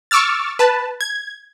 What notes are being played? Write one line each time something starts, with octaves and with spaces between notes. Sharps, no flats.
C#6 D6 E6 F6 A6
B4 A5
G#6